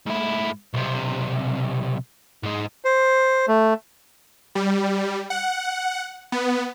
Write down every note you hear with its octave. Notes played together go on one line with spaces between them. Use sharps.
G#2 E4
B1 C3
G#2 G#3
C5
A3
G3
F#5
B3